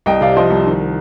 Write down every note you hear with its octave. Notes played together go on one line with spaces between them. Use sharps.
C2 D#5 G5
C3 D5 F5
F3 C5 D#5
C2
D#3